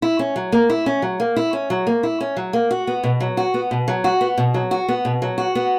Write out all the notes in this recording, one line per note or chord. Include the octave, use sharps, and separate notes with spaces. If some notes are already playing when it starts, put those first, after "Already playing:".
E4
C#4
F#3
A#3
E4
C#4
F#3
A#3
E4
C#4
F#3
A#3
E4
C#4
F#3
A#3
F#4
B3
B2
F#3
F#4
B3
B2
F#3
F#4
B3
B2
F#3
F#4
B3
B2
F#3
F#4
B3